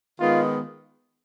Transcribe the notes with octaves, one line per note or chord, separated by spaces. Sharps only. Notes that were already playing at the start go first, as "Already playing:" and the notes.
D#3 G#3 B3 F4